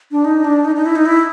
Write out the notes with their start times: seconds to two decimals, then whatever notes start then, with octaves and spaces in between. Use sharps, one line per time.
0.12 D4
0.25 D#4
0.44 D4
0.65 D#4
0.75 D#4
0.86 E4
0.96 D#4
1.06 E4